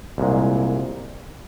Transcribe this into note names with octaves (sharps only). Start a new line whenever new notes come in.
C2 A#2 G#3